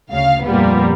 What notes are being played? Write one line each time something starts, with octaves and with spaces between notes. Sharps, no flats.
D2 C#3 F5
F2 A#2 G3 A#3 B3